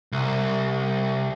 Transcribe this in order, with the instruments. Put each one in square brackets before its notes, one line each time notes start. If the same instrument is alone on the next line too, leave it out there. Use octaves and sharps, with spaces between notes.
[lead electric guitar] C2